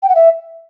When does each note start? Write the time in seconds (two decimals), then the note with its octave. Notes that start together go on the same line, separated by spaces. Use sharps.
0.02 G5
0.09 F#5
0.15 E5